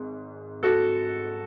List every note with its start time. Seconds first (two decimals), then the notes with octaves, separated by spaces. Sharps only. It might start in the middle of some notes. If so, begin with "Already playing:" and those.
Already playing: G#1 G#2
0.63 F#4 A4